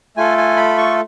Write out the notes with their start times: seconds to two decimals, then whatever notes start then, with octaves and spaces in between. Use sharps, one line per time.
0.17 A3 F4 A4 G#5
0.38 G#5
0.56 B5
0.78 C#6